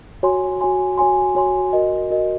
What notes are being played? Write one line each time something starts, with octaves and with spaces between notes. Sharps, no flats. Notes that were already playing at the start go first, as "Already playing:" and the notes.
F#4 C#5 G#5 C6
F#4 C#5 G#5 C6
F#4 C#5 G#5 C6
F#4 C#5 G#5 C6
F#4 A#4 D#5
F#4 A#4 D#5